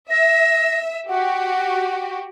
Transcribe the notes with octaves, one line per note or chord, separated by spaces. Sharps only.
E5 A#6
F#4 G4 F#5